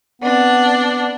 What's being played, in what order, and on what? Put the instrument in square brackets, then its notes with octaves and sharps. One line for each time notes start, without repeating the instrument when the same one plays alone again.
[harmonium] B3 [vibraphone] C4 F#5 [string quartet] D4